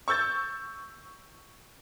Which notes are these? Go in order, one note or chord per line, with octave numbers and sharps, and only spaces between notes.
C#6 E6 G6 A6